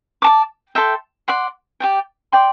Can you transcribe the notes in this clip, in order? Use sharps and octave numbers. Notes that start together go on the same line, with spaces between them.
D5 A5 D6
A4 E5 G5 C6
D5 F#5 C6
G4 D5 G5
D5 G5 C6